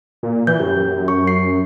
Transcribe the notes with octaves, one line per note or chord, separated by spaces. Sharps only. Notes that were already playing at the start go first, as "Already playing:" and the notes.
A#2
E3 G6
F#2 G4
C#6
C7